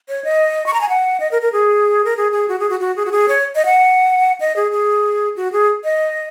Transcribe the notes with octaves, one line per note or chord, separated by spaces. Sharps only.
C#5
D#5
C#6
A#5
G#5
F#5
D#5
A#4
A#4
G#4
A#4
G#4
G#4
F#4
G#4
F#4
F#4
G#4
F#4
G#4
C#5
D#5
F#5
D#5
G#4
G#4
F#4
G#4
D#5